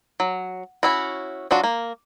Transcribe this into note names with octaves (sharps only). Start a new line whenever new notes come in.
F#3
C#4 E4 F#4
F#3 D4 F4 F#4
A#3